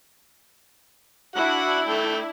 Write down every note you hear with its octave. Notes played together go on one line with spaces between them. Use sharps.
D4 E4 F#4 F#5
A3 G5